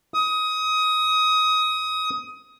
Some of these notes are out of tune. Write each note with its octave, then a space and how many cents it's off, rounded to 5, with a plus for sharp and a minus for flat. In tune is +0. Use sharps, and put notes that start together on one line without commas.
D#6 +20